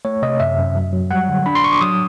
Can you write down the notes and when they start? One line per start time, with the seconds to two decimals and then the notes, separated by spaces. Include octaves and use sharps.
0.05 A3 C#5
0.22 C3 D#5
0.40 F#2 E5
0.57 F#2
0.75 F#3
0.93 F#3
1.11 G3 F#5
1.28 D3
1.46 D4 B5
1.55 C6
1.64 D4 C#6
1.72 D6
1.81 F#3 D#6